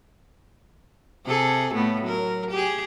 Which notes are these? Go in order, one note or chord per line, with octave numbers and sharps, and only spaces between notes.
C3 G#4 A4
A2 A3 B3
F#3 A#4
G4 G#4